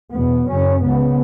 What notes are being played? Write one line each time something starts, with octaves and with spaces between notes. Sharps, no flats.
E2 B2 B3
F#2 C#3 C#4
C#2 C#3 B3